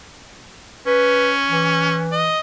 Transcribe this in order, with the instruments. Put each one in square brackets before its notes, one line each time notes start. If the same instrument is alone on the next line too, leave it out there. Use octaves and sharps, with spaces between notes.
[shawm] C#4 [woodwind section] B4
[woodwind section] E3
[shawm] D#5